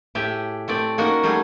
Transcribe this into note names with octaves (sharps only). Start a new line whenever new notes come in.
A2 G4 G#4 E5
A3 C4 D5
A#3 C#4 D#4 F#4 A#4 F#5
F#3 G3 A3 D#4 G#4